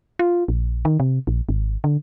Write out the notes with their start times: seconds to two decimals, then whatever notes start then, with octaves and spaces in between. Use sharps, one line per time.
0.19 F4
0.48 A#1
0.85 D#3
1.00 C3
1.27 A#1
1.49 G#1
1.84 D3